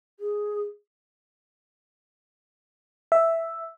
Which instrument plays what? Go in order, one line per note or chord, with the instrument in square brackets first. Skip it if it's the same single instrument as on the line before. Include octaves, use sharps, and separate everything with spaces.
[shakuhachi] G#4
[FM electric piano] E5